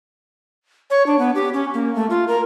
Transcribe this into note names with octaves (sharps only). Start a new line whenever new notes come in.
C#5
D4
B3
G4
C#4
A#3
A3
F4
A#4